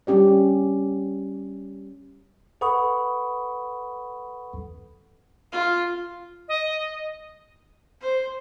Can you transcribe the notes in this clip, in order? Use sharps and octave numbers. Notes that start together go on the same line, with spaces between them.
G3 C#4 G4 D5
A4 B4 F#5 B5 C#6 D#6
F4
D#5
C5